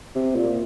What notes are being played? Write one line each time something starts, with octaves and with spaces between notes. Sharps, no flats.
C3
A#2